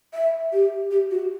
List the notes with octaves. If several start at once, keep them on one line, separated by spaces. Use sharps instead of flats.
E5
G4
G4
F#4